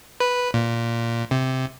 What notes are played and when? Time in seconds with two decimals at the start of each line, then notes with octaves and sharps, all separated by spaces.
0.20 B4
0.54 A#2
1.31 C3